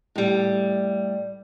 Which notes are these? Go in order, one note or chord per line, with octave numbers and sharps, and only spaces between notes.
A2 G3